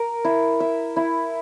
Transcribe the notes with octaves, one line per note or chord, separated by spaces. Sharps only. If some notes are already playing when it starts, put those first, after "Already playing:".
Already playing: A#4
E4
E5
E4